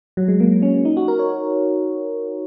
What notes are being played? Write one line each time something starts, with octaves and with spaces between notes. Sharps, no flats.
F#3
G#3
A#3
C#4
D#4
F#4
A#4
C#5